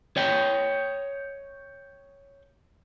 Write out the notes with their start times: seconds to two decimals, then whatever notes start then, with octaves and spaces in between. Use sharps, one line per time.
0.17 C#5 D#5 G5